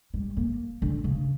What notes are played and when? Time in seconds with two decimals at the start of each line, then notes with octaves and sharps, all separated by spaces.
0.14 G3
0.37 A#3
0.82 D3
1.04 C#3